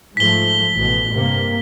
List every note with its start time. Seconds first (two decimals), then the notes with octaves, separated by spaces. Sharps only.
0.17 G#2 F3 A3 B6 G7
0.77 A1 B2
1.12 G2 C3 A#3